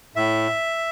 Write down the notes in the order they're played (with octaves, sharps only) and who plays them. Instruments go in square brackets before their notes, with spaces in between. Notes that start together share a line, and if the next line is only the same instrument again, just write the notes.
[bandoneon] A2 E5